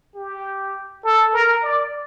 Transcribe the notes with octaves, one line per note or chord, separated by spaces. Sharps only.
G4
A4
A#4
D5